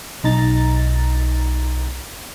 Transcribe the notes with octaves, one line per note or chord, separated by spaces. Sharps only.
B1 D#4 A#5 A6